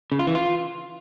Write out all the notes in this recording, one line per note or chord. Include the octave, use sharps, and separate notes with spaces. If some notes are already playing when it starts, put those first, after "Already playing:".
C#3
F4
E3
F4